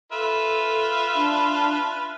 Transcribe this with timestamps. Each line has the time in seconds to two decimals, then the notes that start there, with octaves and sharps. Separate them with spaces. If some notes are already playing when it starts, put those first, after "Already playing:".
0.12 F4 A4 B4 E5
1.16 D4